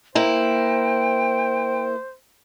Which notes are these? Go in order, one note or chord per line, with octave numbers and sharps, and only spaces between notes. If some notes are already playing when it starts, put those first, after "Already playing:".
A#3 E4 C5 G5